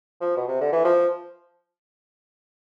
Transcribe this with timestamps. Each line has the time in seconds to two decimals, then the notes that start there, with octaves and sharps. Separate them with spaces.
0.21 F3
0.37 B2
0.48 C3
0.61 D3
0.72 E3
0.85 F3